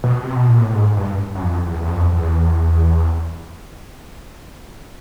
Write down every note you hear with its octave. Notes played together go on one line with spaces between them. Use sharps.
B2
C3
B2
A#2
A2
G#2
G2
F#2
F2
E2
E2
F2
E2